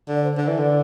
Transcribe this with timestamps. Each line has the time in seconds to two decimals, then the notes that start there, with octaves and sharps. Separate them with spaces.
0.08 D3
0.15 D5
0.24 C5
0.32 D5
0.37 D3
0.48 E3
0.59 D3